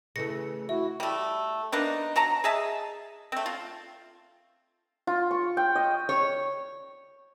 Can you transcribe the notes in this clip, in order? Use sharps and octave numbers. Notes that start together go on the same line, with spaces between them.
C#3 E3 A3 A#6 C#7
E4 F#4 E5
G3 A3
A#3 B3 D4 D#4
F#3 A5 A#5
G#4 D#5 E5 A5
A3 C4
F4
F4
C#6
G5
D#5
C#5